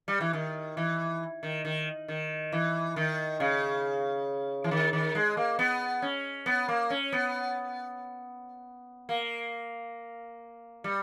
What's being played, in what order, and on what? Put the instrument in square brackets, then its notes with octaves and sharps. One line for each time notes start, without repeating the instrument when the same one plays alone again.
[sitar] G3
E3
D#3
E3
D#3
D#3
D#3
E3
D#3
C#3
E3
D#3
D#3
G#3
A#3
B3
C#4
B3
A#3
C#4
B3
A#3
G3